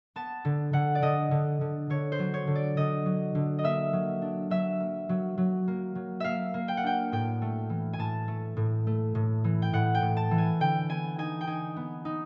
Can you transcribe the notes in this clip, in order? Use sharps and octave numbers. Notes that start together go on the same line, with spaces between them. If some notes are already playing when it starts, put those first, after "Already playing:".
B3 A5
D3
D3 F#5
D5
D3 D#5
D3
D3
D3 C#5
C5
F#3
C#5
D3
D5
D3 D#5
F#3
D3
D#5
A#3 E5
F#3
D4
F#3 E5
A#3
F#3
F#3
A#3
F#3
A#3 E5 F5
A#3
G5
F#5
D4 G5
A2 G5
A3
E3
G#5
A2 A5
A3
A2
A3
A2
E3
G5
A2 F#5
G5
A2
A5
E3
G#5
D3 G5
B3 G#5
D#4 G#5
G5
D#4 G#5
B3
D#4